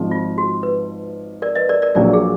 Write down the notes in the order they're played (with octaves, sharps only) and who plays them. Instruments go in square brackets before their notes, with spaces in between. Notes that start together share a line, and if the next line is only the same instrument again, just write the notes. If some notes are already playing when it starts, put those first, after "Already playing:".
Already playing: [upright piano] G#1 G#2 F3
[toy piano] F4
F#4
B4
A#4 D5
B4 D#5
A#4 D5
A#4 D5
[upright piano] A#1 A#2 F#3 [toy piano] A#4 D5
[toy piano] G#4